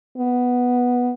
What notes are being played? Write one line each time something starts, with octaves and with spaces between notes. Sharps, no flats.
B3